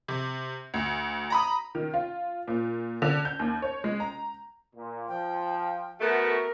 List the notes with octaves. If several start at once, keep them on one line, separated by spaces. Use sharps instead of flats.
C3
D2
A#5 B5 D#6
D#3
F4
A#2
D3
G6
D#2
C#5
G#3
A#5
A#2
F3 G5
A3 B3 F#4 A#4